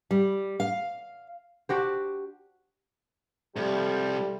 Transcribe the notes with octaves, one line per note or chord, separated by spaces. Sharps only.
G3
F5
D4 F#4 G4 C5
C2 F3 G3 A3